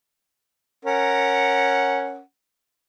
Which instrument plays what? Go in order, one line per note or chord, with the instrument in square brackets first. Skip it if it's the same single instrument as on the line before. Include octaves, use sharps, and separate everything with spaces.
[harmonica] C#4 A#4 F#5